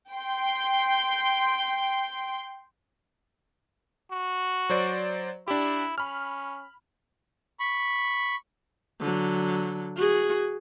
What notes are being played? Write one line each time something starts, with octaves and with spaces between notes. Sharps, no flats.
G5 C6
F#4
F#3 C5 D5
D4 E4 G4
C#4 B5 F6
B5 C#6
D3 F#3
F#4 G#4